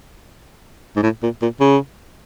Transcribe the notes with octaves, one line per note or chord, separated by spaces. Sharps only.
G#2
A2
A#2
A#2
C#3